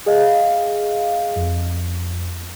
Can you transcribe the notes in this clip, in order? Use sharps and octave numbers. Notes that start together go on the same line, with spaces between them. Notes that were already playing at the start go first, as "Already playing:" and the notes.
G#4 D#5 F5
F2